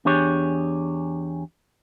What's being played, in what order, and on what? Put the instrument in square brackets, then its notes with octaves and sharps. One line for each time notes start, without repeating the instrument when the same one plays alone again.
[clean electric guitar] E2 D4 G4 G#4 C#5